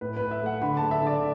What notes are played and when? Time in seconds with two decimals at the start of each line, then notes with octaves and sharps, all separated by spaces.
0.01 A2 B4
0.17 A2 B4
0.31 E5
0.42 A3 F#5
0.62 D3 B5
0.77 A3 A5
0.91 E5
1.02 D3
1.07 D5